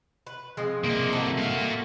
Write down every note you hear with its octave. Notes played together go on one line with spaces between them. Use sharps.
B4
F3 G#3 C4
C2 A#3
A3 F#4
A#2 F5